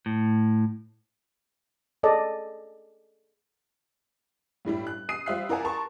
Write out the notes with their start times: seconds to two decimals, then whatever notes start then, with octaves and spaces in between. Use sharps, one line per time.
0.06 A2
2.03 G#4 A4 D5 D#5 A5
4.65 G1 A2 G3 E4
4.87 F#6
5.09 D#6 C7 D#7
5.26 G3 F4 C5 E5 F#6 C7
5.49 E4 A#4 D5 F#5 G#5 A5
5.64 A#4 A5 C6 C#6